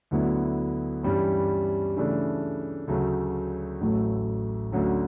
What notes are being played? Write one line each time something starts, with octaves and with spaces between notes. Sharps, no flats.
D2 D3 F#3 B3 E4
G2 E3 G3 C#4
C#3 E3 A3 D4
D2 C#3 F#3 A3
A1 A2 F#3 A3
D2 D3 F#3 C#4